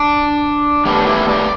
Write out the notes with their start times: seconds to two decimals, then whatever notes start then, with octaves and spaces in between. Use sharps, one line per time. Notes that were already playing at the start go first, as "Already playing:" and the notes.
Already playing: D4
0.85 A2 G3 B3 D4
1.07 E4
1.29 D5